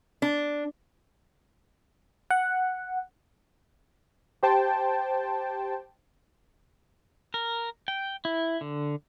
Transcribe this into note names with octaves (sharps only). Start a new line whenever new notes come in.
D4
F#5
G4 C5 G5 A5
A#4
G5
E4
D3